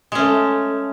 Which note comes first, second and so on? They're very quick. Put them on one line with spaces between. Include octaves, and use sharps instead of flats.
G#3 C#4 A3